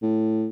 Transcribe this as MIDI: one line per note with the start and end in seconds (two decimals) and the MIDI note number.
0.02 0.48 45